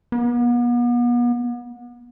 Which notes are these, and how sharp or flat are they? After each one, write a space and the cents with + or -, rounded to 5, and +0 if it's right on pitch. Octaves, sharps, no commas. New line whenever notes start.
B3 -40